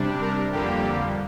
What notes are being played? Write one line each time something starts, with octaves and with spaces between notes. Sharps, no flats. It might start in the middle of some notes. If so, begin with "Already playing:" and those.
Already playing: C3 G3 D4
A#4
F2 D3 G3 A#3 G4